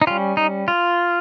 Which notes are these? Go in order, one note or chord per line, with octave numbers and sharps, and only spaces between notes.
D#4
G3 C#4 F4
D#4
F4